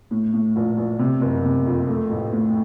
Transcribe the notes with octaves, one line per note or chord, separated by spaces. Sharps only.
A2
A2
A#1
A#1
C3
F#1
C3
F2
A3
A1
A2